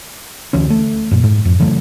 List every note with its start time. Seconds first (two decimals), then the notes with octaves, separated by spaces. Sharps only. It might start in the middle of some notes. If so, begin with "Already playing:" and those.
0.53 D2 E3 C#4
0.70 A3
1.11 F#2 A#2
1.23 G#2
1.45 F2
1.60 C#3 E3 F#3 A3